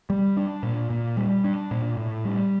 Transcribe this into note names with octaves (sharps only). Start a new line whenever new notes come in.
G3
D4
A#2
A#2
G3
D4
A#2
A2
G3